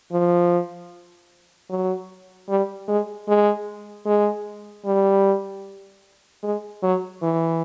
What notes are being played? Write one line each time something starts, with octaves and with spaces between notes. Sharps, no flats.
F3
F#3
G3
G#3
G#3
G#3
G3
G#3
F#3
E3